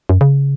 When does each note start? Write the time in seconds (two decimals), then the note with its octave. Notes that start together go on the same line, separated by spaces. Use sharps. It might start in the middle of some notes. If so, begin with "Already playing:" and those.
0.09 F#2
0.21 C#3